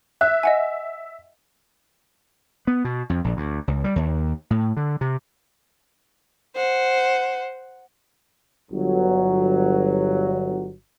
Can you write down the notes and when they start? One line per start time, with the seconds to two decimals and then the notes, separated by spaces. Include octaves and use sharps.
0.21 E5 F#6
0.43 D#5 F#5 G#5
2.67 B3
2.85 B2
3.10 F2
3.24 A#1
3.37 D2
3.68 C#2
3.84 G3
3.96 D#2
4.50 A2
4.77 D3
5.01 C3
6.56 C5 F#5
8.71 G1 F#3